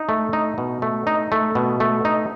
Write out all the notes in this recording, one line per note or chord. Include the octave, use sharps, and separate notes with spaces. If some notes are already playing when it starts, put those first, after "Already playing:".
Already playing: D#4
A3
D#4
B2
A3
D#4
A3
B2
A3
D#4